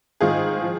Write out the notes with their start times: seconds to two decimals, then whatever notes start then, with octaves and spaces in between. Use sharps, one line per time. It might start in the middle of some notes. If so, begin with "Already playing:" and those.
0.21 G#2 D#3 F4 G#4
0.62 F3